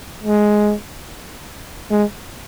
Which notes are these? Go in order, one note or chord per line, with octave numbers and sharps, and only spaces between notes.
G#3
G#3